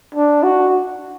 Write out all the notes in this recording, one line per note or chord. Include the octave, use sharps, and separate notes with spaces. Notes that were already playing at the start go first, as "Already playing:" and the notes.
D4
F#4